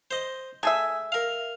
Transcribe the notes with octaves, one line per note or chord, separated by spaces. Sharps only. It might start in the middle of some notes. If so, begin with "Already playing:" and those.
C5 D#5
A3 G#4 E5 G#5
A#4 F5